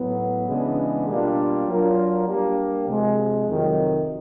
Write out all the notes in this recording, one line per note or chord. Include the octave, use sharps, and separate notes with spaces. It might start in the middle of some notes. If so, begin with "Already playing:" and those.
Already playing: A2 F#3 B3
C#3 E3 G#3 B3 D4
B2 G3 A#3 D4 F4
F#3 A#3 D4 F4 A#4
G3 A#3 D4 G4 A#4
C3 F3 G#3
F2 C3 D#3 F#3